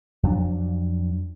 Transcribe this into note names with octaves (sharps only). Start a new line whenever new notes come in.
F2 F#3 D4